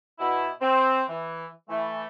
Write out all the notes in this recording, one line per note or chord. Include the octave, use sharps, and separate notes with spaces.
B2 B3 E4
C4
E3
E3 A3